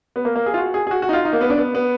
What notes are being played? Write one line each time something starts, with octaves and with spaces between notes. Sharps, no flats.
B3
A#3
A#3
G#4
F4
F#4
G#4
G#4
F#4
F#4
D#4
F4
D#4
A#3
B3
D4
B3
B3